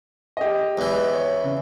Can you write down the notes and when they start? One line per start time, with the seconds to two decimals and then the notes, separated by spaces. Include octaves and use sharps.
0.37 G4 D#5
0.78 E2 E3
1.13 C#5
1.44 C#3